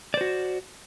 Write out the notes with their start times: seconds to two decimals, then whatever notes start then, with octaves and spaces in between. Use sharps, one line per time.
0.14 D5
0.17 C5
0.21 F#4